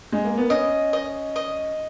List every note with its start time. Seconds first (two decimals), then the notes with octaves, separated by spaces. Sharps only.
0.12 G#3
0.25 A#3
0.37 B3
0.49 C#4 D#5
0.93 D#5
1.36 D#5